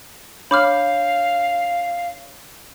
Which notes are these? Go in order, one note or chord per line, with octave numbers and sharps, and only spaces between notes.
D4 C#5 F5 B5 D6 F6 G6